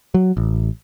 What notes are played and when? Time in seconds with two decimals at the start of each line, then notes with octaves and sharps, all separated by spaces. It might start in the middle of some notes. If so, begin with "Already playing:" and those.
0.14 F#3
0.37 A1